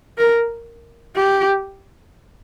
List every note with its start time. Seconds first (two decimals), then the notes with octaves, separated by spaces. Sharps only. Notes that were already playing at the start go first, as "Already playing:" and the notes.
0.18 A#4
1.15 G4